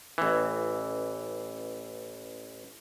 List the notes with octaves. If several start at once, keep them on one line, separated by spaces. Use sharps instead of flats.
A1 E3